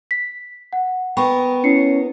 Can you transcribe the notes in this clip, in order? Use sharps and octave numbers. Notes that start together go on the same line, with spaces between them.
B6
F#5
B3 A#4 G5 B5 C#6
C#4 E4 C7 C#7